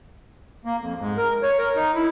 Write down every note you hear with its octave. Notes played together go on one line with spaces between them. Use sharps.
A#3
F2
G#2
A#4
C#5
A#4
D#4
E4